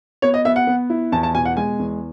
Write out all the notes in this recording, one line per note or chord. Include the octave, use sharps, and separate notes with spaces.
B3 C#5
D#5
B3 E5
F#5
B3
E4
E2 A5
A5
B2 G#5
F#5
G#3 G#5
E2